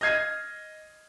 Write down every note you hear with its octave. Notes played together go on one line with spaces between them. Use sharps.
D#5 F6 G#6 C7 D#7